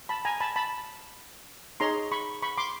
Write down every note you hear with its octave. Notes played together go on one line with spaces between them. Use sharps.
A5 B5
G#5 A#5
A5 B5
A5 B5
D#4 G#4 C#5 A#5 C6
B5 C#6
B5 C#6
C6 D6